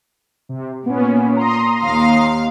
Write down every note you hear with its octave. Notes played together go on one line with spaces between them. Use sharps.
C3
A#2 B3 C#4
A#5 C6 D#6
D#2 F5